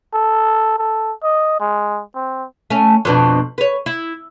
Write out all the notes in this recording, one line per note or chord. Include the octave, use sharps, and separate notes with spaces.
A4
A4
D#5
G#3
C4
A3 C#4
F2 B2 D4
B4 C#5
E4